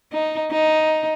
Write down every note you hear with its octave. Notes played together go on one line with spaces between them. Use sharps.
D#4
D#4